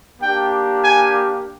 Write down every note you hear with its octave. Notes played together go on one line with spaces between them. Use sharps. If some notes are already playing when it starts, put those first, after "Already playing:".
A#3 D4 G4 G5
G#5